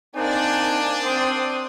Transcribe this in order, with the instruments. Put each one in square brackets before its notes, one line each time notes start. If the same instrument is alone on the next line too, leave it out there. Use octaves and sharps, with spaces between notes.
[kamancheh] A#3 G#5 [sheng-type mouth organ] C4 D#4 [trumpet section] D4 D5
[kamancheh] C4 D#6 [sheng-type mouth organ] C5 C6